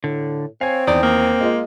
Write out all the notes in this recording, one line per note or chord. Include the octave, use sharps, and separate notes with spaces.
A2 D3
C4 C#5 F5 G#5
E2 D#3 D5 G5 D#6
A#3
G#3 F4 D#5